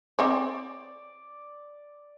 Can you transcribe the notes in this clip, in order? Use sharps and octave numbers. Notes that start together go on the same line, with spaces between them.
C4 C#5 D5